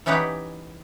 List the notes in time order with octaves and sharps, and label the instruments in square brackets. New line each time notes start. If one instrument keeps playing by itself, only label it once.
[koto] E3 C#4 D#4 G4 B4 F#5